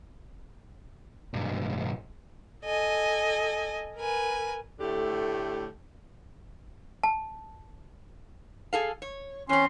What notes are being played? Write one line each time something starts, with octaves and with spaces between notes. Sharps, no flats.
B1 G2
A4 D#5 G#5
A#4 B4 G#5
A2 D3 A3 G4
A5
G#4 A4 F5
C#5
E2 C4 C#4 C6